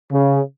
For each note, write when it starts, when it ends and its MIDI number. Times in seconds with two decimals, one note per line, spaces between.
0.12 0.38 49